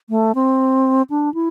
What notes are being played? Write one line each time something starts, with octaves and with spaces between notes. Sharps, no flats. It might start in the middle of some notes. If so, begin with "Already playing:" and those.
A3
C4
D4
E4